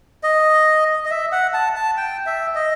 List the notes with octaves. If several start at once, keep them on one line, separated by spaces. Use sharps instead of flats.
D#5
D#5
E5
F#5
A5
A5
G5
E5
D#5